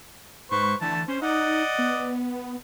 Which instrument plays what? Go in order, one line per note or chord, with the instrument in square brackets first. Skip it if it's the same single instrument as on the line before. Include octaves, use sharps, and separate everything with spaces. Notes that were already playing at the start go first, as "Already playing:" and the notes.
[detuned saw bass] G#2 [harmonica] B4 C5 C#6
[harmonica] D3 A3 A5 [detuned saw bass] E3
[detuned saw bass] C#4 [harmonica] C5
[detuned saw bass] D#4 [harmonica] D5 D#5 F#5
[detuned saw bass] B3